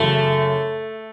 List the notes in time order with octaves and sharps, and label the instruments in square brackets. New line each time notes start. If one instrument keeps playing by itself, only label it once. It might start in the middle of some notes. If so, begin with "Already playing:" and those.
Already playing: [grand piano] F#2 C#3 E3 [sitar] A3